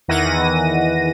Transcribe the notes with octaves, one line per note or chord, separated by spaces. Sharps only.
E2 D#3 E3 F#5 A#6 D#7